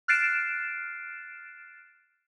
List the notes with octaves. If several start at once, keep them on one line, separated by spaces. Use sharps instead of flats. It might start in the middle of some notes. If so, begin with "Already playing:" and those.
F6 F#6 A6 C7 D7 E7